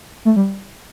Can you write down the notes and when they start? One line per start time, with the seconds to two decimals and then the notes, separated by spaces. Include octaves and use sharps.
0.25 A3
0.36 G3